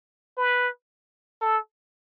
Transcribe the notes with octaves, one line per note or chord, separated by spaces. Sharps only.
B4
A4